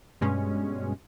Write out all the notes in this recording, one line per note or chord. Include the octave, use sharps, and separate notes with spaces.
G2 B2 G#3 C#4